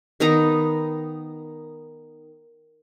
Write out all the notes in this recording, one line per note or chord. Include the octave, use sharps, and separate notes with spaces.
D#3 B3 D#4 A#5